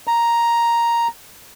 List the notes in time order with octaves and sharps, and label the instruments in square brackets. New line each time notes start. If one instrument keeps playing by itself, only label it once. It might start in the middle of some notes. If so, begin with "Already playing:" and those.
[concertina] A#5